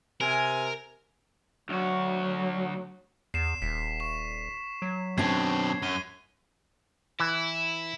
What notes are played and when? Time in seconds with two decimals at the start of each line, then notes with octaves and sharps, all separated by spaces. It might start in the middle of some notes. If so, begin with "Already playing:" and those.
0.21 C3 A#4 G#5
1.69 D2 F#3 F#4
3.34 E2 C7 E7
3.62 D#1 B6
4.00 C#6 E7
4.82 F#3
5.18 F#2 B2 C4 D4 G#6 C7
5.82 F#2 C7 D#7 G7
7.20 E3 E4